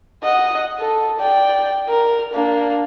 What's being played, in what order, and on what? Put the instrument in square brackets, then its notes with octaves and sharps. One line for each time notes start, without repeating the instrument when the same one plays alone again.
[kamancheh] D#5 F#5
A4
D5 G5
A#4
A#3 D4